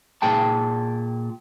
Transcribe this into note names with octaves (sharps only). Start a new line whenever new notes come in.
A#2 G#4 G5 A5